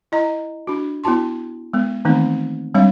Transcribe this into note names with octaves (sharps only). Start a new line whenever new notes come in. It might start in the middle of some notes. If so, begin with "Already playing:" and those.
E4 D#5 A#5
D4 F#4
B3 E4 F#4 A5 C6
G#3 B3
D#3 E3 A3 B3 C4 D#4
G3 G#3 C4 D4 C#5 F5